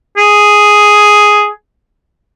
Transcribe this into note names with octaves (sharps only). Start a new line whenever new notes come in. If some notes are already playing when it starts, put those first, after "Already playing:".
G#4